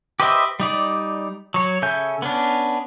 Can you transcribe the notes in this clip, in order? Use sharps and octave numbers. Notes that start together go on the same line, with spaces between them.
G4 B4 C5 D#5 E5
G3 D#4 D5
F#3 C#5
C#3 A4 E5 G#5 G6
B3 C#4 D4